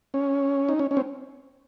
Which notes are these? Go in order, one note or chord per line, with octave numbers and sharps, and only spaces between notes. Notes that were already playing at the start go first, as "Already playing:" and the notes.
C#4
D#4
C#4
C#4
C4